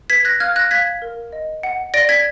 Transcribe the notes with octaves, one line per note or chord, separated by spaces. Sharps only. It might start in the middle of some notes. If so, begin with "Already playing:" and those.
B4 G#6 B6
F#6 A#6
F5 F6 G#6
F#6 A#6
F5 G#6 B6
A#4
D#5
F#5
D5 A#6 D7
G#6 B6